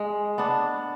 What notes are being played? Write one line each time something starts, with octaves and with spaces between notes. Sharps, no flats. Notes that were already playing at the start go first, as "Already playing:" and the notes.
Already playing: G#3
B3 D4